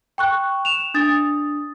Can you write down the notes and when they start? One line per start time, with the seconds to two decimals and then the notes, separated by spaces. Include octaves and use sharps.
0.18 G5 C#6 F#6
0.65 E7 F7
0.94 D4 D#6 A6